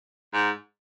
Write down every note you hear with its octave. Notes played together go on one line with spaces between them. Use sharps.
G#2